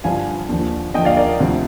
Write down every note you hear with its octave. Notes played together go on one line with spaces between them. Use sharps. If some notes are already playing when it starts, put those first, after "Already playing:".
G2 D3 F3 F5 G#5
D#2 D3 F3
D#2 D3 F3 D#5 G5
D5 F5
A#4 D5
D2 C3 F3